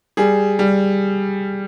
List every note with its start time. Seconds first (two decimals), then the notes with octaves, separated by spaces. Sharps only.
0.17 G3 G#4
0.59 G3